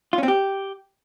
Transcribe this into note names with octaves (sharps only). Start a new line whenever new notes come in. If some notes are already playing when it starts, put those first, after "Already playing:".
F4
C#4
C4
G4